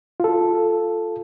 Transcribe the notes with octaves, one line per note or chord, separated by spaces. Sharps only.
F4 A4